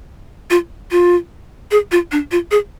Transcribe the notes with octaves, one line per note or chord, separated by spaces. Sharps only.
F4
F4
G#4
F4
D4
F4
G#4